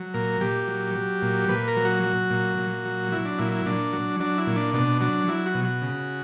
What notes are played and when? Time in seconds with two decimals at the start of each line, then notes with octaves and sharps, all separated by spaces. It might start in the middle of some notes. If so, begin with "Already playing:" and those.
Already playing: F#3
0.14 A#2 A#4
0.41 A#2 G4
0.68 F#3
0.95 F#3
1.22 A#2
1.49 A#2 B4
1.68 A#4
1.76 F#3
1.85 F#4
2.03 F#3
2.30 A#2
2.58 A#2
2.85 F#3
3.12 F#3 E4
3.25 D4
3.39 A#2 E4
3.52 E4
3.65 A#2 D4
3.93 F#3
4.20 F#3 D4
4.38 E4
4.47 A#2
4.56 D4
4.73 B2 D4
5.01 F#3 D4
5.28 F#3 E4
5.46 F#4
5.55 B2
5.65 F#4
5.82 C#3